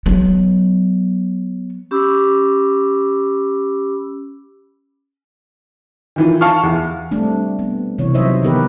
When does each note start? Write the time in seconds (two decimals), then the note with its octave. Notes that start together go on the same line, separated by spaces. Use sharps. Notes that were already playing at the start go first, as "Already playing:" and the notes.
0.06 F#3 B3
1.91 C#4 G4 B5 D6 E6
6.16 D#3 E3 F4
6.41 F5 A5 C#6 F6
6.63 E2
7.11 G3 A3 C4 D4
7.59 B3
7.99 C3 E3 C#5
8.14 F#3 D#4 C5 C#5 D#5 E5
8.43 D#3 E3 B3 G4 A#4 B4